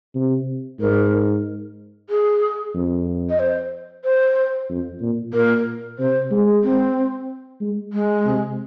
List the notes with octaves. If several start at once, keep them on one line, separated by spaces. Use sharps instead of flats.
C3
G#2 A#4
G#4
F2
D#5
C5
C5
F2
A#2
A#2 A#4
C3 C5
G#3
C4
G#3
G#3
C3